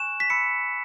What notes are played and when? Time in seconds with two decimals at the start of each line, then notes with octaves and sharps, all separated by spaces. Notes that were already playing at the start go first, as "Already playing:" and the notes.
Already playing: G#5 C#6 F#6 E7
0.20 B6
0.30 B5 E6 C#7